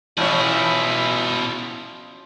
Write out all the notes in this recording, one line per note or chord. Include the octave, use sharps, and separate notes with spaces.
A1 B2 F3 C#4 E4 G#4 C#5